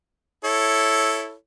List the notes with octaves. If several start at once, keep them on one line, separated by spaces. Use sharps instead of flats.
E4 A4 C#5